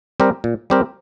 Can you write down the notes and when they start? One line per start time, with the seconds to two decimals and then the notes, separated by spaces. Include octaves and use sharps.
0.20 G3 C4 G4 A#4
0.44 A#2
0.70 G3 C4 G4 A#4